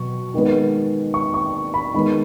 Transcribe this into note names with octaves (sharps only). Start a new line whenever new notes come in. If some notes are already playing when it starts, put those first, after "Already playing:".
Already playing: B2 F#3 C#6
D#3 G#3 B3
C#6
C#6
B5
D#3 G#3 B3 B5